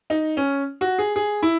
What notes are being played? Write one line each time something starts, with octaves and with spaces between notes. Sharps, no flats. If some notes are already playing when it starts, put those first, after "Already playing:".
D#4
C#4
F#4
G#4
G#4
E4